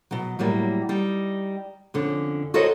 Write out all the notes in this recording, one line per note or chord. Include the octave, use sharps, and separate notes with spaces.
B2 F#3
A2 F#3 G3 A#3
G3 D#4
F2 D3 C#4
F#4 A4 A#4 C5 C#5 D#5